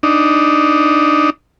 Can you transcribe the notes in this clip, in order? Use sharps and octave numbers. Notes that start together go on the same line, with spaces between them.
D4 D#4